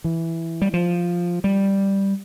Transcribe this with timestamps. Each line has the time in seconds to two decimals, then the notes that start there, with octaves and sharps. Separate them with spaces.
0.04 E3
0.62 G3
0.74 F3
1.44 G3